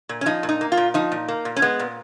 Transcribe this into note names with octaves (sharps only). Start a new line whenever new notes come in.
A#2
C#4
F3 D#4
A#2
D#4
A#3
F4
A#2
F3 D#4
A#2
A#3
A#2
C#4
G#3 B3
A#2